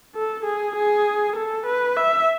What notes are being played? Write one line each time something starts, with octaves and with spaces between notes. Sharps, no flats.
A4
G#4
G#4
A4
B4
E5